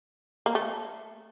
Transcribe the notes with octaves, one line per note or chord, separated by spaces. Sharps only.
A#3
A3